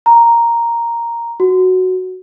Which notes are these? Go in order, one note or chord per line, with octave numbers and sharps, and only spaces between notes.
A#5
F#4